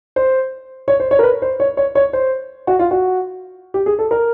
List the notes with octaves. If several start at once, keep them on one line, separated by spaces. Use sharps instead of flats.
C5
C#5
C5
C#5
A#4
B4
C5
C#5
C#5
C#5
C5
F#4
F4
F#4
G4
G#4
A4
A#4